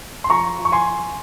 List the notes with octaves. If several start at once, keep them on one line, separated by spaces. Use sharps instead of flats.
C6
F3 A#5 C#6
F3
C#6
G#5 C6